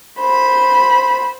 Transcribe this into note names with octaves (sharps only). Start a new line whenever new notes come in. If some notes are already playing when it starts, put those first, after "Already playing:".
C5 B5